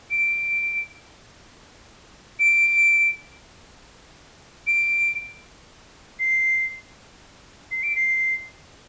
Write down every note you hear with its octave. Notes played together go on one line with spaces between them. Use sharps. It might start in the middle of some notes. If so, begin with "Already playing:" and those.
D7
D7
D7
C7
C7
D7
C7